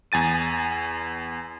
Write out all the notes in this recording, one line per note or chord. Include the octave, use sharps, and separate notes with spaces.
E2 G#5 A6 D#7